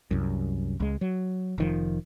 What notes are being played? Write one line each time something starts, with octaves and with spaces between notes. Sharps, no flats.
C2 F#2
C#2 G#3
F#3
F1 D#3 F3